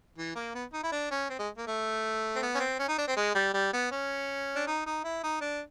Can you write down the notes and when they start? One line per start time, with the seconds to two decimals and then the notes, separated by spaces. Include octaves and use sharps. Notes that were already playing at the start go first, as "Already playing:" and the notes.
0.18 E3
0.36 A#3
0.55 B3
0.74 D#4
0.83 E4
0.92 D4
1.11 C#4
1.30 C4
1.39 G#3
1.58 A#3
1.67 A3
2.36 C4
2.42 B3
2.55 C#4
2.60 C4
2.80 C#4
2.88 D#4
2.98 D4
3.08 C4
3.17 G#3
3.35 G3
3.54 G3
3.73 B3
3.92 C#4
4.55 D4
4.67 D#4
4.86 D#4
5.04 E4
5.23 D#4
5.41 D4